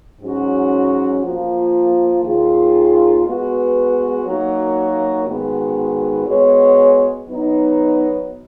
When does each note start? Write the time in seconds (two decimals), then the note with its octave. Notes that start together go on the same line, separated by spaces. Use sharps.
0.21 G#2 F#3 C#4 F#4
1.22 F3 A#3 F4
2.24 D#2 D#3 A#3 F4 G#4
3.24 G#3 B3 F#4 B4
4.25 F#3 A#3 D#4 F#4
5.26 G#2 D#3 G#3 B3 F#4
6.26 G#3 B3 F#4 C#5
7.28 F#3 B3 D#4